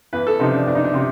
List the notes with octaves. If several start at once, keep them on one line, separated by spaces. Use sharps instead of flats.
E2 B4
A4
C3 F3 D#4
D4
E2 D4
D#4
D4
C3